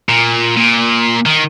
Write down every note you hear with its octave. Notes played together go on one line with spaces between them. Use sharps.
A#2
A#2
D#3